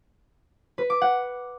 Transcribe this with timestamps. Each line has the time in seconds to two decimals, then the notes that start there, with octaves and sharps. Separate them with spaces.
0.78 B4
0.90 D6
1.02 F#5